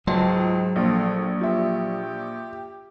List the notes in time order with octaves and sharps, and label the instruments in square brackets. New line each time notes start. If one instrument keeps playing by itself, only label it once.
[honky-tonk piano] C#2 [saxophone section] G#2 [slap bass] F#3 [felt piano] A5
[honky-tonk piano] A#1 [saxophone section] A3 D4 F4
[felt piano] F4 E5 [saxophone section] G4